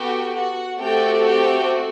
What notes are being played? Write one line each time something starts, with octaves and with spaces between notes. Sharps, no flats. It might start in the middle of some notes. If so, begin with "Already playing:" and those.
Already playing: B3 F#4 G4 A4 G5
F#4 F#5
A3 C4 F#4 G4 A4 G5
G4 G5